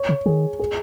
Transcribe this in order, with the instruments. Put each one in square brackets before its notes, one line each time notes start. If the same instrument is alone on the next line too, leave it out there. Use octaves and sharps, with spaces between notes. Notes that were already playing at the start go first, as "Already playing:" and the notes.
Already playing: [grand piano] C#5
[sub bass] C#3
[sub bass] D#3 [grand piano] G#4
[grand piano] G#4